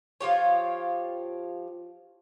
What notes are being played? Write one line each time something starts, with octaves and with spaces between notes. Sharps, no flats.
F3 F4 G4 C#5